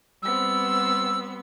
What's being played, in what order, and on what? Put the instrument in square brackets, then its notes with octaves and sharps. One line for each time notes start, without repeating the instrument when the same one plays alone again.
[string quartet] G3 B3 C4 [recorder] E6